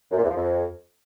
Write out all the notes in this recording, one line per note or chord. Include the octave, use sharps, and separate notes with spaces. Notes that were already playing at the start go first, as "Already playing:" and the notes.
F#2
A#2
E2
F3
F2